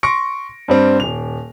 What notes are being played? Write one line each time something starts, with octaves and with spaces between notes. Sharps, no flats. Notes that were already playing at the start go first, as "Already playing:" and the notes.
C6 C#6 A#6 C#7 D7
G2 G3 C4
D#1 F7